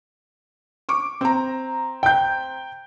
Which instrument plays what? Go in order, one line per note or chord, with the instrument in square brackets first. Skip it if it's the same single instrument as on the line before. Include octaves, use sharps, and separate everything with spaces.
[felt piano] C#6 D6
C4 A#5
[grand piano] G5 G6